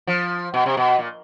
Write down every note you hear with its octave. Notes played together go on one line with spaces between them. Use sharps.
F3
B2
C3
B2
A#2